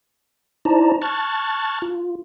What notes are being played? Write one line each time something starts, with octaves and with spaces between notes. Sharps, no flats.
D#4 E4 C5 D5 A5 A#5
A5 C#6 F6 F#6 G#6 A6
F4